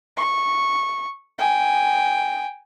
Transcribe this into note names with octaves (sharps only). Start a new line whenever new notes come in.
C#6
G5 G#5